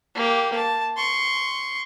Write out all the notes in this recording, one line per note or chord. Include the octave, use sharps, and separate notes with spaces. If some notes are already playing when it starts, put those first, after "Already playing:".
A#3 G4
A5
C6 C#6